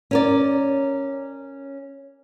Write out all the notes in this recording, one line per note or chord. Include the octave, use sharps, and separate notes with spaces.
C#4 A#4 D5